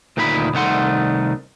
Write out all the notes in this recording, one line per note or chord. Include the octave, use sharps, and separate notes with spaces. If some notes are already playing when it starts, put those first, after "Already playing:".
D2 A#2 D#3 E4 F4 B5
C2 D#3 A3 F#5 C6